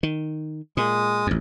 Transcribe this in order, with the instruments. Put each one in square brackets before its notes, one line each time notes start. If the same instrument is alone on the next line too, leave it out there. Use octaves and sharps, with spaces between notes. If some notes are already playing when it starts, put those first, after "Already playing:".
[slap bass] D#3
[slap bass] A#2 [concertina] G#3 D#6
[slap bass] A1 F2